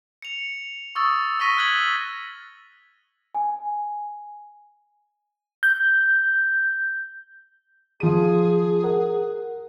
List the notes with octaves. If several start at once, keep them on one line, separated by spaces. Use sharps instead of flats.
C#7 F7
C#6 D#6 E6 A6
C#6 E6 A#6 B6 D#7 G7
F6 F#6 G#6 B6 F#7 G7
G#5
G6
F3 G#4 D#7
A#4 F#5